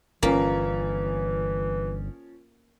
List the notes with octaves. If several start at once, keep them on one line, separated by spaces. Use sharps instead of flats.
G1 E3 F3 A#3 C#4